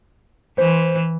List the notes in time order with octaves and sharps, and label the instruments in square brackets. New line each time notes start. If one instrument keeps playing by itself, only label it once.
[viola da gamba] E3 [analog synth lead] C5